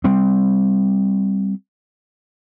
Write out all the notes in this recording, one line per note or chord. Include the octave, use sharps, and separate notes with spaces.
G3 C4